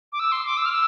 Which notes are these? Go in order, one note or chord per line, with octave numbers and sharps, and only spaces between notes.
D6
E6
C6
D6
E6
F6
E6